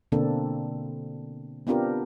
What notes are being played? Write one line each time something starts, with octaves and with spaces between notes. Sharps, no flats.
B2 D3 A#3 C4 D4 A4
B3 C4 D4 F4 G4 A#4